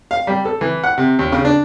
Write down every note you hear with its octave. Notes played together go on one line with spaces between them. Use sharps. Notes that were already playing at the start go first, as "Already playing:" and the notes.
F5
G3
A4
E3
F#5
C3
D#2
C#3
D4